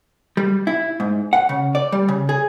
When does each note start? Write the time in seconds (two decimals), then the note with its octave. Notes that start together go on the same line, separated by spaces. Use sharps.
0.37 G3
0.67 E4
1.00 G#2
1.33 F#5
1.49 C#3
1.75 D5
1.92 G3
2.08 C#3
2.29 G#4